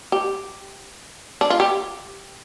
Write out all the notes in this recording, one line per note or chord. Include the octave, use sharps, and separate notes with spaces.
G4
D4
F4
G4